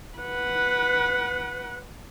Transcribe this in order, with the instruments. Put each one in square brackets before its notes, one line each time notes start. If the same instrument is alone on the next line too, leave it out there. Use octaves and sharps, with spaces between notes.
[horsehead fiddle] B4 F#5